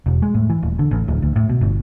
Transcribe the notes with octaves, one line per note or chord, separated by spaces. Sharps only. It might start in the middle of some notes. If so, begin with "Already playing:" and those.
E1
G#3
A2
E3
D#1
D3
A1
D1
D2
A2
B2
G1